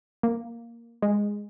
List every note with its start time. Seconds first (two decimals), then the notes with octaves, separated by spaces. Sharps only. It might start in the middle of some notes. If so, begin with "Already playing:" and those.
0.23 A#3
1.02 G#3